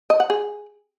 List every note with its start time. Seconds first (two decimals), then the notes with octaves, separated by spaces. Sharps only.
0.10 D#5
0.20 F#5
0.30 G#4